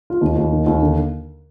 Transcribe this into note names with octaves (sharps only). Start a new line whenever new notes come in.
F4
D#2 D#4
D#2
D#3
D#2
D3